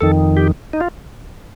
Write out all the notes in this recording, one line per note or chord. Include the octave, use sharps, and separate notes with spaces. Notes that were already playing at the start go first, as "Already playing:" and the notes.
F2 D#3 A4
G4
D#4
F4